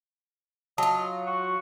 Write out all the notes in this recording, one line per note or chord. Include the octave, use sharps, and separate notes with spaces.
F#3 F4 D#5 A5
F#4 C#6